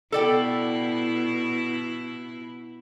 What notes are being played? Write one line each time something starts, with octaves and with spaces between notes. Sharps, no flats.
B2 E4 A4 D5 G5